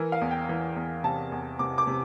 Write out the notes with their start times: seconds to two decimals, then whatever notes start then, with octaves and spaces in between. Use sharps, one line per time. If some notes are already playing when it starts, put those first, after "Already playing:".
Already playing: E3 A#4
0.12 F5
0.21 E2
0.31 G5
0.49 E3
0.76 E2
1.04 C3 A5
1.32 E2
1.59 C3 D6
1.78 D6
1.87 C3